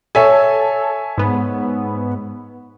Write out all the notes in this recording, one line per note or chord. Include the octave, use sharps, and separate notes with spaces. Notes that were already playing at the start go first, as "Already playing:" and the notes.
A4 C#5 E5 G#5
G#2 B3